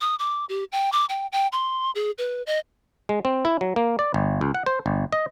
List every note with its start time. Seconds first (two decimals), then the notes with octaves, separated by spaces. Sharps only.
0.01 D#6
0.19 D6
0.49 G4
0.72 G5
0.92 D6
1.09 G5
1.32 G5
1.52 C6
1.95 G#4
2.18 B4
2.47 D#5
3.09 G#3
3.25 C4
3.45 E4
3.61 F#3
3.76 A#3
3.99 D5
4.14 G1
4.41 C#2
4.54 F#5
4.66 C5
4.86 G1
5.12 D#5